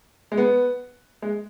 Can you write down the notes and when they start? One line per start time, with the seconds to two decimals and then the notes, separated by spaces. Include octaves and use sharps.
0.32 G#3
0.37 B3
1.22 G#3